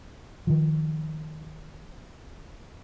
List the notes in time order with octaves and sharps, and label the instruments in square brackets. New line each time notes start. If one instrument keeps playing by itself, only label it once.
[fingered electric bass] D#3 F3